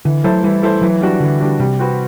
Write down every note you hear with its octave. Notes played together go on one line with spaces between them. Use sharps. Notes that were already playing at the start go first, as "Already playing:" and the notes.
D3 E3
F#3 A3 E4 A4 C5
E3 G3
A3 E4 A4 C5
E3 F#3
G3 D4 F#4
D3 E3
G3 D4 F#4
C3 G3
C4 F#4 B4